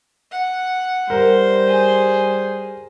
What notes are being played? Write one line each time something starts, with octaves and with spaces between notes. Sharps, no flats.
F#5
G3 A#4 C5
G#4